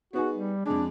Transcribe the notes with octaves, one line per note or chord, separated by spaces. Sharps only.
B3 D#4 F#4 G#4
G3
F2 G#3 D4